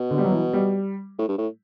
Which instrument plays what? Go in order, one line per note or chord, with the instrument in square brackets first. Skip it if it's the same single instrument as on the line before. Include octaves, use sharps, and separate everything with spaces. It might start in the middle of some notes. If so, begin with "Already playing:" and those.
Already playing: [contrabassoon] B2
[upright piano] D3
G3
F#3
E3
G3
[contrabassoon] A2
G2
A2